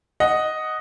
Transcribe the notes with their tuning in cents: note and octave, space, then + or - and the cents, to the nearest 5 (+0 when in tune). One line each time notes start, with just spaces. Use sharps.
D#5 +0 F#5 +0